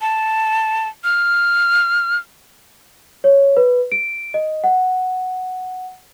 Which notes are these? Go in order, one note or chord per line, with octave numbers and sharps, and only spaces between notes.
A5
F6
C#5
B4
D7
D#5
F#5